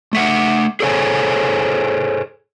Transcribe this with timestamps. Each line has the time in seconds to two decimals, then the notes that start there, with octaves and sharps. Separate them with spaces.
0.13 A3 E5 F#5
0.80 G#4 A4 C5 C#5 G5 G#5